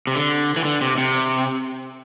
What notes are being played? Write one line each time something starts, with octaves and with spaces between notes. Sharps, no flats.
C3
D3
E3
D3
C3
C3